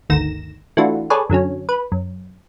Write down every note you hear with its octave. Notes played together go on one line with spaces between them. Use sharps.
G1 D2 D#3 A#6 E7
E3 A3 D4 F4 F#4
G#4 A4 B4 C#5 D5
F#2 D3 F#3 C#4
B4
F#2